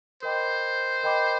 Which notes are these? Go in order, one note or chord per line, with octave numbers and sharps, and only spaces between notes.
A#4 C5 D#5 G5 B5 D6
A#4 D#5 G5 B5 D6